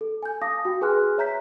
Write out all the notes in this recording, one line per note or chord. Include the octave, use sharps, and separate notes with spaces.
A4
G#5 G6
F5 A5 D6 D#6 A#6
F#4 G5
G#4 B4 G#5 C6 F6 F#6
C#5 E5 A#5 G6 B6